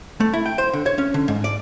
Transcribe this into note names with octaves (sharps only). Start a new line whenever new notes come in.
A3
E4
G5
C5
D3
C#5
C#4
D3
G#2
D5